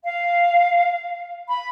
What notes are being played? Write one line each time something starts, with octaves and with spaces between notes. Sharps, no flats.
F5
B5